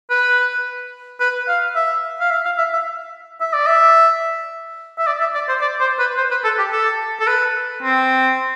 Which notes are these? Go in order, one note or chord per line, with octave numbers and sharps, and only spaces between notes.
B4
B4
F5
E5
F5
E5
F5
E5
E5
E5
D5
E5
E5
D5
E5
D5
C5
D5
C5
B4
C5
B4
A4
G4
A4
A4
B4
C4